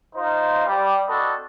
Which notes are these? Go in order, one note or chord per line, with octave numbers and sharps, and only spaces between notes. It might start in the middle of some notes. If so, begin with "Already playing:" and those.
D#4 F4 C5
G3
C4 D4 F#4 A4 B4 D#5